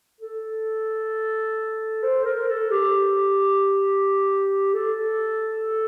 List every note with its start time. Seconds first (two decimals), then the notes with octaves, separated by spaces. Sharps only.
0.21 A4
2.03 C5
2.25 A#4
2.48 A4
2.71 G4
4.74 A4